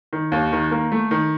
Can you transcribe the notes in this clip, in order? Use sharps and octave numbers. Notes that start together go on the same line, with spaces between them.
D#3
D#2
D#3
A#3
A3
D#3